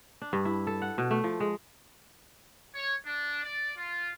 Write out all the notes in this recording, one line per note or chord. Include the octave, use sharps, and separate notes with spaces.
D4
G2
E4
A4
F#5
B2
A3
F3
G#3
C#5
D4
D5
F4